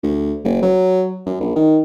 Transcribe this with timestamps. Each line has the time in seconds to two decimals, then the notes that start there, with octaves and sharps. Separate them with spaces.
0.03 D2
0.44 F#1
0.62 F#3
1.26 F#2
1.41 A#1
1.56 D#3